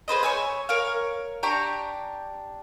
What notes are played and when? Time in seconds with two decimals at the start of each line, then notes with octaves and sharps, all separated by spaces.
0.08 G#4 B4 C5 D#5
0.23 C#5 G#5 E6
0.69 A#4 C#5 F5
1.43 D4 G4 A#5 C#6